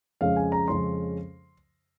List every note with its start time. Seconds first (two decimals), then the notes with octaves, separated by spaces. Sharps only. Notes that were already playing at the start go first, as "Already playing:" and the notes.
0.21 F2 C#3 G#3 C#4 F5
0.36 G#5
0.52 A#5
0.68 F2 C#3 G#3 C#4 C6